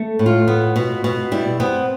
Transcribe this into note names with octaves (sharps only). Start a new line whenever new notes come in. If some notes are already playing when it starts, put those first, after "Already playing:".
Already playing: A3
A2
F4
B3
B2
B2
G3 E4
B3 C4